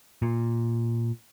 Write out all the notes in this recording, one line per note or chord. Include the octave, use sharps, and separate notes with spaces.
A#2